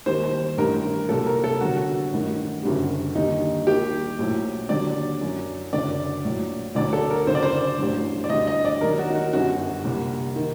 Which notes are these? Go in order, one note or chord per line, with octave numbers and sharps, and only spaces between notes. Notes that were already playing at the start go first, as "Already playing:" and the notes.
D#2 D#3 G3 C5
C5
A1 G2 D#3 G3 A#4
C2 A#2 F#3 A4
A#4
A4
G1 G2 D3 F#3 F#4
F#4
F#4
A1 G2 D#3 G3
F#1 F#2 D3 G3
D#2 D3 G3 D#4
D#2 D#3 G3 G4
A#1 A2 F#3
D#2 D3 F#3 D5
F#2 F#3
F#1 F#2 D3 F#3 D5
A#1 A2 F#3
D2 D3 F#3 D5
A4
A#4
F#1 F#2 D3 C5
D5
C5
A1 G2 F#3
D5
D2 D3 G3 D#5
D#5
D5
D#2 D#3 F#3 A#4
F#4
D#4
F#4
G1 F#2 D3 G3 F#4
C2 A#2 G3
D#3